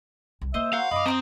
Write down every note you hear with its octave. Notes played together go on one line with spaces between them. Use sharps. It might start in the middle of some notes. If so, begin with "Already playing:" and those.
C2
A#3 C5 D#5 E5
F#4 A#4 C5 F5
F#2 D#5 B5 D6
C4 A#5 D6 D#6